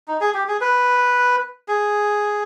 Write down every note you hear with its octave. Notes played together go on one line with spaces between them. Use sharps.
D#4
G#4
G4
G#4
B4
G#4